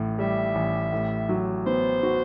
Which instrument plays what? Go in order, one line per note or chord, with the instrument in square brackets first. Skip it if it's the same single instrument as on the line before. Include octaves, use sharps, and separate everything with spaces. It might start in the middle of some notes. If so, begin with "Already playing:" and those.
Already playing: [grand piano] A1 A2
[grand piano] G3 [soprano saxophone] E5
[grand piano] A1
A2
F#3
[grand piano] B3 [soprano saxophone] C5
[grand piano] F#4